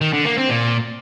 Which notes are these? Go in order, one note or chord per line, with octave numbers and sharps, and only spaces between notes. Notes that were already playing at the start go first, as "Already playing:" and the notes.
D#3
D3
A#3
C4
A#2